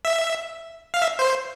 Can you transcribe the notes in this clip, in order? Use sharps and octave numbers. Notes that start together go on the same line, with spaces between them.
E5
F5
E5
C5